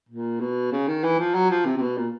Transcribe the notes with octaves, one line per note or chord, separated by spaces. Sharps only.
A#2
B2
C#3
D#3
E3
F3
F#3
F3
C3
C3
B2
A#2